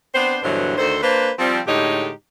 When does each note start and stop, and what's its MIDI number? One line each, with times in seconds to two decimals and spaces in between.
0.15 0.39 59
0.15 0.39 60
0.15 0.39 62
0.15 0.39 72
0.43 0.77 43
0.43 0.77 47
0.43 0.77 50
0.43 0.77 52
0.43 0.77 54
0.43 0.77 72
0.77 0.98 38
0.77 0.98 51
0.77 0.98 69
0.77 0.98 72
1.03 1.32 58
1.03 1.32 62
1.03 1.32 71
1.03 1.32 72
1.38 1.60 53
1.38 1.60 55
1.38 1.60 60
1.67 2.10 45
1.67 2.10 50
1.67 2.10 56
1.67 2.10 63
1.67 2.10 67
1.67 2.10 73